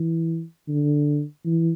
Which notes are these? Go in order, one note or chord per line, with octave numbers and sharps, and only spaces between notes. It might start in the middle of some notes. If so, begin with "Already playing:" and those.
Already playing: E3
D3
E3